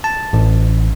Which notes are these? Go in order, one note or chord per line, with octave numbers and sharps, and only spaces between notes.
A5
A1